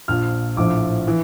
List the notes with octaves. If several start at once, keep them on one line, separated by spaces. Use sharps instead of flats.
A#1 A#2 F3 F6
A#1 A2 F3 D6
E3